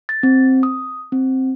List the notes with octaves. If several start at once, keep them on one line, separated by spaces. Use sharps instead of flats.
A6
C4
D#6
C4